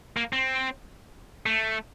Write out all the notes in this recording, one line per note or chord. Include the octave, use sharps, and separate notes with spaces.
A#3
C4
A3